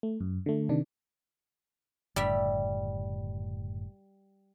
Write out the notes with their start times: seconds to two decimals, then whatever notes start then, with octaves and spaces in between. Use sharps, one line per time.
0.03 A3
0.21 F#2
0.46 D3 A3
0.69 C3 D#3 D4
2.16 F#1 A2 D3 G3 E5